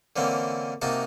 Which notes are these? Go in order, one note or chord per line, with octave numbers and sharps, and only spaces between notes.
D3 E3 A#3 C4 C#4
C3 A#3 D#4 F#4 A5